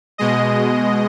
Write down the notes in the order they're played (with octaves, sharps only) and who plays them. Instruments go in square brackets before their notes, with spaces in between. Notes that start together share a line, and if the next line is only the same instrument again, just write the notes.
[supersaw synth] B2 G#3 D#5